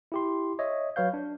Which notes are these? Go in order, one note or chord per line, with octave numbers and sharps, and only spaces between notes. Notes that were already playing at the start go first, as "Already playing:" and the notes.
E4 G4 C6
C#5 D#5 E5
F#3 B4 C#5 F5 G6
D4